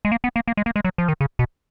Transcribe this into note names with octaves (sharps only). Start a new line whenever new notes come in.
G#3
A#3
B3
A#3
A#3
G#3
A#3
G#3
F#3
F3
D#3
C#3
B2